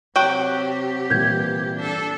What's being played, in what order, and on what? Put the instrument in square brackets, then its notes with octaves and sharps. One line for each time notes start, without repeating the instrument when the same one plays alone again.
[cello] C3 G4 [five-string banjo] F#3 F#4 G5
[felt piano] A#2 E3 G3 [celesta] G6 G#6
[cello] D4 A4